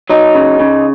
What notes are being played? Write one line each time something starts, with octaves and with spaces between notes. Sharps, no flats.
F#3 D#4
C#3
C#3